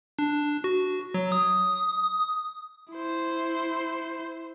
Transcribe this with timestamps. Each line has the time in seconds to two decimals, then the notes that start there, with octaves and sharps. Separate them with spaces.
0.19 D4
0.64 F#4
1.14 F#3
1.32 D#6
2.92 E4 C5